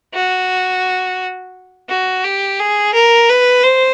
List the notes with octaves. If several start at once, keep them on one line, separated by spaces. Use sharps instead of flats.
F#4
F#4
G4
G#4
A#4
B4
C5